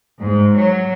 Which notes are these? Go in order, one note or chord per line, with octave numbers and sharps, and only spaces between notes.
G#2
F#3